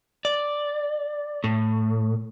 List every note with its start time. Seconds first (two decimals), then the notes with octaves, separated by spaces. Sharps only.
0.25 D5
1.44 A2